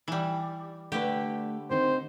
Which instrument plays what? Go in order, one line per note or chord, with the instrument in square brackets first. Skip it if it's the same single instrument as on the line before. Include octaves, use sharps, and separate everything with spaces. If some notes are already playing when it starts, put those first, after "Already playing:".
[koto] E3 G3
[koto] D3 G4 [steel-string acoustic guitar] A3 B4
[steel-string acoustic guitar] D#3 C4 D#4 [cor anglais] C5